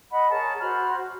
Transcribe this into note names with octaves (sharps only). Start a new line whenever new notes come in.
D#5 F#5 B5
G#4 A#4 C#5 A5
F#4 C5 B5 F6